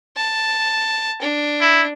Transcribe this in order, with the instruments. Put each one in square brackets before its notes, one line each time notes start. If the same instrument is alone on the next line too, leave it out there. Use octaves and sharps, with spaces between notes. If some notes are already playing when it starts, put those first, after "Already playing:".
[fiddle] A5
D4
[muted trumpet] E4